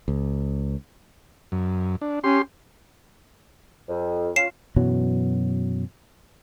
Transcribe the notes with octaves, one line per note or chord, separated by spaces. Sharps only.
C#2
F#2
D4
C#4 G4 C6
F2
C#4 F4 C7 E7
F#2 B2 E3 F#3